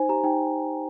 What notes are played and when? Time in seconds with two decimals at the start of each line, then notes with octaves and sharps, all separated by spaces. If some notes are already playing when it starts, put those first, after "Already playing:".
Already playing: D#4 C5 G#5
0.09 G4 A#5
0.24 D#4 G5